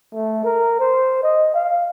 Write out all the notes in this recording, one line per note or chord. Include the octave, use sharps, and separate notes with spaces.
A3
A#4
C5
D#5
F5